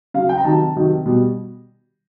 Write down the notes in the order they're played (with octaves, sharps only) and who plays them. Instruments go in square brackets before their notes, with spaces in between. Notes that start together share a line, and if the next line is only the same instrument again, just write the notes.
[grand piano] C#3 F#3 F5
G5
A#5
C3 D#3 F#3 A5
C3 D#3 F#3
B2 G3